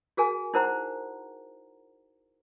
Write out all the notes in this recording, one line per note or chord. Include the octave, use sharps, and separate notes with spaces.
F#4 G#4 A#4 G#5
D#4 E4 A#4 C5 F#5 A#5